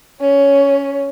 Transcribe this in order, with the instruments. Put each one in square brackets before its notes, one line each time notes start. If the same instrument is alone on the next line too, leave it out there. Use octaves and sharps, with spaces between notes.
[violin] C#4 C#5